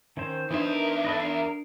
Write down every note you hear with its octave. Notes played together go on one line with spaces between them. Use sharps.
D#3 C#4 C5 E5
E2 E3 D4 D#4 B4 C5 E5
A#4
A4 B4 D#5
D4 A#4 C7